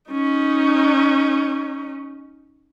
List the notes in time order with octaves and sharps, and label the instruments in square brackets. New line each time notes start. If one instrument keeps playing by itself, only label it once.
[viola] C#4 D#4